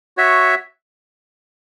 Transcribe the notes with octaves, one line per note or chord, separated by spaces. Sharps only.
F#4 C#5 E5